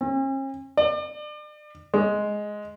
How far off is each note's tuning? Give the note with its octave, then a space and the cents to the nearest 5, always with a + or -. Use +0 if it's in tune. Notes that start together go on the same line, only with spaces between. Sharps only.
C#4 -45
D5 +35
G#3 +5